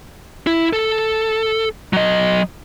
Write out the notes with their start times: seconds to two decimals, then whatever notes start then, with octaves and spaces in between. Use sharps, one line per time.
0.47 E4
0.73 A4
1.93 F#3 D#5